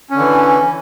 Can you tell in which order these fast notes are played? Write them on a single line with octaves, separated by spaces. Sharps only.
C#4 D3 E3